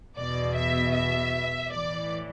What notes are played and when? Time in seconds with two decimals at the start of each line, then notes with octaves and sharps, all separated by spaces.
0.16 E2 B2 D5
0.56 E5
0.93 E5
1.71 A2 E3 D5